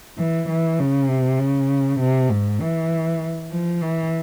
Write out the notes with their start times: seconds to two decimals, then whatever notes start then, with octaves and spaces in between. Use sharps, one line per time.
0.18 E3
0.49 E3
0.79 C#3
1.09 C3
1.39 C#3
1.99 C3
2.30 G#2
2.60 E3
3.51 F3
3.82 E3